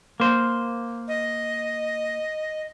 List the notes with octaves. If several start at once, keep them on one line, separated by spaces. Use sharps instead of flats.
A#3 C5
D#5